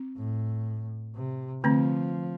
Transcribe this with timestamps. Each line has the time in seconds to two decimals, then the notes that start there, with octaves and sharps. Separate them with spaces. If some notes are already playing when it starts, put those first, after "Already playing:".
Already playing: C4
0.17 A2
1.15 C3
1.64 D3 F3 A3 C4